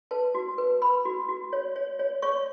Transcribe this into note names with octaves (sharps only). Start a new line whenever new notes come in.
B4 A5
F#4
B4
B4 B5
F#4
F#4
C#5
C#5
C#5
C#5 C#6